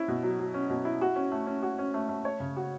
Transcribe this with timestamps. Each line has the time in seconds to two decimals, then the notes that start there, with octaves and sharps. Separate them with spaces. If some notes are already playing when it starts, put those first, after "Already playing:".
Already playing: C#4 E4
0.08 B2
0.23 F#3
0.39 F#3
0.54 C#4
0.70 B2
0.85 E4
1.01 F#4
1.16 C#4
1.32 A3
1.47 C#4
1.63 F#4
1.79 C#4
1.94 A3
2.09 A3
2.25 C#5
2.40 C#3
2.56 F#4